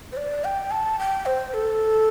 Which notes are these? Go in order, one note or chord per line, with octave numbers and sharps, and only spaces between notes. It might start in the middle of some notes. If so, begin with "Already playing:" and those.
C5
D5
G5
A5
G5
C5
A4